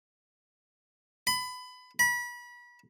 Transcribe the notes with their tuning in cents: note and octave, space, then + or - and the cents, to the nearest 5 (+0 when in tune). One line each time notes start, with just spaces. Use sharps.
B5 +25
B5 -30